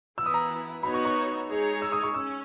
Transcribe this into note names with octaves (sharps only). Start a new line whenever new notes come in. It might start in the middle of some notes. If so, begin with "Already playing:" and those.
E3 B3 E4 E6
D#6
A#5
B3 D#4 F#4 C#5 B5
C#6
C#6
G#3 D#4 G#4 C#5
E6
D#6
C#6
C#4 E6